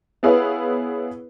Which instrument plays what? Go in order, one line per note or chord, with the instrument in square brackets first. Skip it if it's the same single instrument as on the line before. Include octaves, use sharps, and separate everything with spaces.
[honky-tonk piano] B3 E4 G#4 B4 C#5 F5